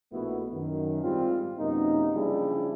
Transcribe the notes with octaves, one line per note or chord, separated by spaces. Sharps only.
A#1 B2 A3 B3 E4 F#4
F#2 D#3
G#2 G3 C4 F4
F#2 C3 A#3 B3 D#4
C#3 F3 G3 D4 E4 G#4